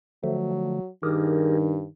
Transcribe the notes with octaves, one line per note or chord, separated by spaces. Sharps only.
D3 F3 F#3 A3
G2 D#3 G4 G#4 A#4